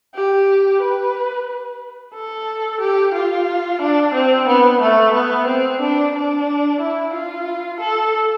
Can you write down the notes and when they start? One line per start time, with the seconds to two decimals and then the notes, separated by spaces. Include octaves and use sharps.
0.15 G4
0.82 B4
2.14 A4
2.81 G4
3.14 F4
3.81 D4
4.14 C4
4.47 B3
4.81 A3
5.14 B3
5.47 C4
5.80 D4
6.14 D4
6.80 E4
7.13 F4
7.80 A4